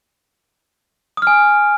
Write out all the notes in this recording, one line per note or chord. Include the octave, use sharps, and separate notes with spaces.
G#5 D#6 F6